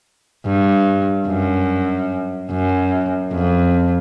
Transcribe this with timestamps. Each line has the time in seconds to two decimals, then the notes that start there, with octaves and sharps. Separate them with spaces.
0.45 G2
1.28 F#2
2.51 F#2
3.32 F2